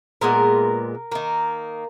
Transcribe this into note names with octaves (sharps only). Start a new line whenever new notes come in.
A#2 G#3 B3 A#4
D#3 A#3